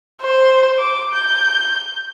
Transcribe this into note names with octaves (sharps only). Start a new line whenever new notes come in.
C5
D6
G6